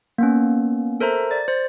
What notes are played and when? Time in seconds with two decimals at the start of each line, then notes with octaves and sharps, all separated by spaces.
0.18 A#3 B3 C#4
1.00 A4 A#4 C5 E5 A#5
1.31 D5 A6
1.48 C5